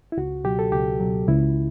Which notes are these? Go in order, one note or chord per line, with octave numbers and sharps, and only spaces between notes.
E4
C#2 F#4
B2 F#3 G4
A4
C#2 G4
B2 F#3
C#2 E4